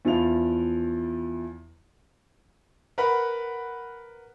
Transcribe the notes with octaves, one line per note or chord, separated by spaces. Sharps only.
E2 F3 E4 F5 F7
A#4 B4 F#5 B5